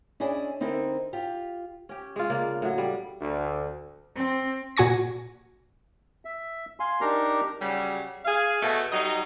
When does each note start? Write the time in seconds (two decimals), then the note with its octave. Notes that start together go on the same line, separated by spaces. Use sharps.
0.20 C#4 D4 E4 G#4 D5 D#5
0.60 D3 C4 D#4 E4 A#4
1.13 F4 G4
1.89 C#4 G4
2.16 G#3 F4
2.29 C#3 A#3 D4
2.62 A2 F#3
2.78 G3
3.21 D2
4.15 C4
4.77 A#2 F#4 G#5 C#6 A#6
6.25 E5
6.80 F5 G#5 C6
7.01 D4 D#4 G4 A#4 A#5
7.61 C#3 F#3 G3
8.25 G#4 F5
8.62 B2 A3
8.92 F#3 G3 D#4